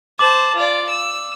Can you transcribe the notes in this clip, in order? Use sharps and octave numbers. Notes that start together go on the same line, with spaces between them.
C5 A5 D6 F#7
F4 D5
E6